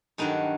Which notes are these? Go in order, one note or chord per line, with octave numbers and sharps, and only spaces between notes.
G2 D#3 F#3 D#4